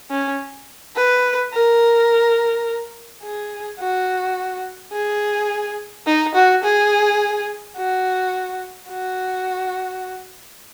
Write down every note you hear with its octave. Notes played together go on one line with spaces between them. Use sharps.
C#4
B4
A#4
G#4
F#4
G#4
D#4
F#4
G#4
F#4
F#4